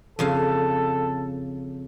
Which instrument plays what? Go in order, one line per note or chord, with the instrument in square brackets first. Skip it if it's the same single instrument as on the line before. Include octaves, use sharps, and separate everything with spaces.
[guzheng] F2 C#3 F5 [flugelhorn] A4